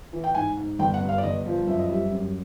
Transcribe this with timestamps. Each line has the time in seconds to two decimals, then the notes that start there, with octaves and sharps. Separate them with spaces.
0.13 E3
0.24 G5
0.35 G#2 G#5
0.57 G#2
0.79 G1 G5
0.94 F#5
1.01 G2
1.09 F5
1.18 D5
1.23 G1 D#5
1.46 F3
1.67 F#2 E5
1.79 D#5
1.90 G3 E5
2.11 F#2